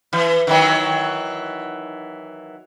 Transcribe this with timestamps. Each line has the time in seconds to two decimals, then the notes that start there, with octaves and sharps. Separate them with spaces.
0.13 E3
0.47 D#3 E3 F#3